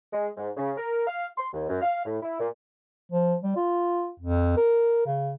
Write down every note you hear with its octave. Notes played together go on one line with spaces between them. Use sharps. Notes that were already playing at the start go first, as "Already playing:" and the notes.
G#3
G#2
C#3
A#4
F5
C6
D#2
F#2
F5
A2
E4
A#2
F3
G3
F4
F2
A#4
C#3